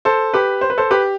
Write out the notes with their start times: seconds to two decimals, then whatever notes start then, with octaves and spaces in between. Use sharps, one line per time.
0.05 A4 C5
0.34 G4 B4
0.61 C5
0.70 B4
0.78 A4 C5
0.91 G4 B4